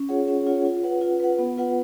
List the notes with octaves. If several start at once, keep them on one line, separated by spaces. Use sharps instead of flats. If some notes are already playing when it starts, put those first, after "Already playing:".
Already playing: C#4
F4 G#4 C#5 F#5
C#4
F4 G#4 C#5 F#5
F4
B4 F#5
F4
B4 F#5
B3
F4 B4 F#5